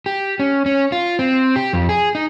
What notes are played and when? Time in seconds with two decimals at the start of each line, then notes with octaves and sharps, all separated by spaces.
0.06 G4
0.39 C#4
0.66 C#4
0.92 F4
1.19 C4
1.56 G4
1.73 F2
1.89 G#4
2.15 D#4